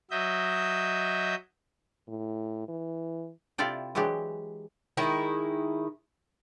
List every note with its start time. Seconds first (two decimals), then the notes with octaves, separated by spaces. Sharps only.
0.11 F#3 D#5 E5 G6
2.08 A2
2.68 E3
3.58 C3 E4 F4 A4 D5 G5
3.95 E3 F#3 G#3 D4 G4
4.97 D#3 G#3 E4